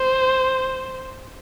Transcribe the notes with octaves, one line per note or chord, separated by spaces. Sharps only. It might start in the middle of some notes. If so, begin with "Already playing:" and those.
Already playing: C5